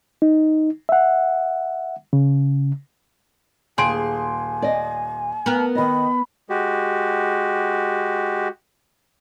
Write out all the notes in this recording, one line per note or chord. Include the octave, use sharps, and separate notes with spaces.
D#4
E5 F#5
C#3
D#1 G#4 G#5 C6 D7
D5 D#5
B3 A#4
D#3 D#5 B5
G#3 F#4 G4